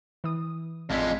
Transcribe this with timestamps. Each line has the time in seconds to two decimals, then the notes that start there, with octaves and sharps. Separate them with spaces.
0.24 E3 D#6
0.90 A1 F2 G#3 D5 B6